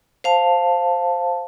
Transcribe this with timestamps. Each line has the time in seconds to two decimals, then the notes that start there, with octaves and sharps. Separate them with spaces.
0.24 C5 F5 A5